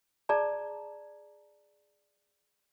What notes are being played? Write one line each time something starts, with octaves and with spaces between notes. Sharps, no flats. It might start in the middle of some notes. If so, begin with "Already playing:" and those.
G#4 D5 A5 A#5